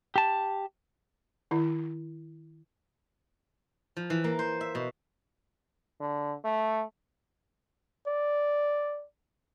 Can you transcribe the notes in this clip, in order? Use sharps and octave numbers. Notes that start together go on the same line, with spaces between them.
G4 A5
D#3 E4
F3
E3
A#3
C5
E5
B2
D3
A3
D5